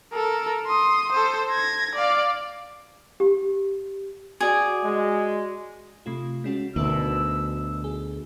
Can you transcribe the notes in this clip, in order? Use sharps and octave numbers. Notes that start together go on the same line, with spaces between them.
A4 A#4
C6 D#6
A4 C5
G#6 A#6
D5 F5
G4
F#4 G#4 D5 D6
G#3
C3 A3 F4
G#3 C#4 F#4
D2 B2 D#4 A#4 E5 E6
G#4